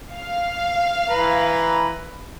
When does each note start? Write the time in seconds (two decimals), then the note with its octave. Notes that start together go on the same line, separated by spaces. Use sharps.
0.13 F5
1.09 E3 B4 A#5